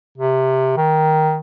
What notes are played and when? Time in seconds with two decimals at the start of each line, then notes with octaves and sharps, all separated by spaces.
0.18 C3
0.77 D#3